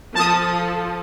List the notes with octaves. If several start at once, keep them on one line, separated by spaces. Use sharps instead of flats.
F3 A4 A5 D#6